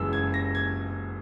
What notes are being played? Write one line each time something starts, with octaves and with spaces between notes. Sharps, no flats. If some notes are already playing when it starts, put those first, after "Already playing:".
Already playing: F#1 F#2 C#3 E3 G#3 E6
G#6
A#6
G#6